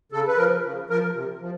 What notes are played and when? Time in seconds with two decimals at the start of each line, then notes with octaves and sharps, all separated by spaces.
0.12 C#3 A4
0.28 B4
0.37 F3 A#4
0.64 C#3
0.89 F3 A#4
1.14 C3
1.41 F3